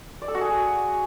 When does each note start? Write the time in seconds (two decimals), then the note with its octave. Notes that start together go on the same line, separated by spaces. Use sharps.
0.22 D5
0.28 A4
0.35 F#4
0.41 G#4